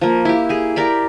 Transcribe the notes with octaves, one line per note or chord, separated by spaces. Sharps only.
F3 A#3
E4 G4
G4 G#4
G4 A#4 D5 B5